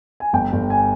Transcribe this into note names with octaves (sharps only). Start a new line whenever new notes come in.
G#5
G1 G5
G1
G#5